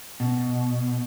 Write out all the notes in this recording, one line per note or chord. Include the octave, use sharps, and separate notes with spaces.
B2